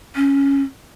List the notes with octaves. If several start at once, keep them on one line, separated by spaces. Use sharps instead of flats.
C#4